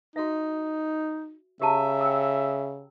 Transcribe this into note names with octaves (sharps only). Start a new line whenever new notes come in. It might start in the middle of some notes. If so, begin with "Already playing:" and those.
D#4 F#4 E5
C#3 G4 E5 A5 A#5
G5 E6